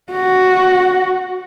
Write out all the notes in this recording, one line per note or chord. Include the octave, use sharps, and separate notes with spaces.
F#4